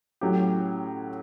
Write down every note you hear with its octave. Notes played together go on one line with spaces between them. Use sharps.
A2 F#3 C#4 G4